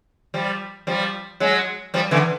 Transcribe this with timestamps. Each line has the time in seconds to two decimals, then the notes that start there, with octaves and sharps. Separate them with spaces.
0.34 F3 G3
0.87 F3 G3
1.40 F#3 G#3
1.94 F3 G3
2.11 D3 E3